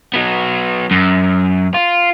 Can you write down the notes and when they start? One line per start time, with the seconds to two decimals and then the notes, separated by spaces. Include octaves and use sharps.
0.13 F#3 B3
0.91 F#2
1.74 F4